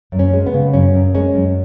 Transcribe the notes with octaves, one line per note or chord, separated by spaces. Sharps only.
F#2
C#4
G#3
B3
C#3
F#2 C#4
F#2
G#3 C#4
F#2